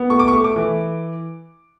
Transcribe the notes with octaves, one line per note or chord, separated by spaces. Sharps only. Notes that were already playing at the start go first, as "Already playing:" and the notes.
Already playing: B3
A3 C#6
D6
C#6
A3
D6
E3